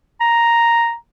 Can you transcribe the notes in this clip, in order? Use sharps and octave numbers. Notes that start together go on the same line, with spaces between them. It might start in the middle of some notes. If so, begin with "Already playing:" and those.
A#5